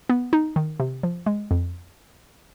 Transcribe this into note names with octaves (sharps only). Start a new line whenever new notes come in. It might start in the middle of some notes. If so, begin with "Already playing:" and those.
B3
D#4
D#3
C3
F3
G#3
F2